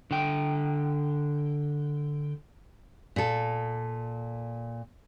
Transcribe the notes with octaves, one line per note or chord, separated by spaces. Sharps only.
D3 G5
A#2 A4